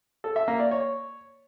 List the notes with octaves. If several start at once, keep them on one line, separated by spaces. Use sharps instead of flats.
A4
E5
A#3
D5
C#5